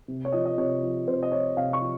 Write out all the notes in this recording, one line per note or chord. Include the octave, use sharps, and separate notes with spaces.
C3
C#5
F3 D#5
D#5
C3 C#5
F3
C3 C5
D#5
F3 C#5
C3 F5
C#6
F3